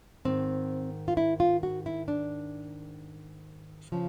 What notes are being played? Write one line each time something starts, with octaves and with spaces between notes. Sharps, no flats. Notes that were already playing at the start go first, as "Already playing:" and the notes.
G#2 D#3 C4
F4
E4
F4
F#4
E4
D4
C#3 F3